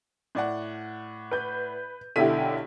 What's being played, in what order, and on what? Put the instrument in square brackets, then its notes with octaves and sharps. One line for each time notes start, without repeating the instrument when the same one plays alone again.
[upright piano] A2 D5 F#5
[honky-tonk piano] B4 G6
[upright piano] B1 B6 D#7 [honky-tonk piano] D3 E4 G4